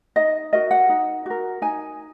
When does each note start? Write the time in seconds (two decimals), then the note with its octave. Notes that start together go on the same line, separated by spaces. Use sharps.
0.16 D#4 D#5
0.53 F#4 A#4 D#5
0.71 F#5
0.89 D#4
1.26 F#4 A#4
1.62 D#4 G#5